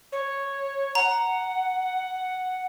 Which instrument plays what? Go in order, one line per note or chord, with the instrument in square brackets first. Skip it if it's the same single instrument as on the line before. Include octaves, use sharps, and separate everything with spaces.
[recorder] C#5
[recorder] F#5 [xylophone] A#5